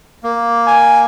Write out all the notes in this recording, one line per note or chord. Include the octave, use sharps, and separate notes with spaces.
A#3
G#5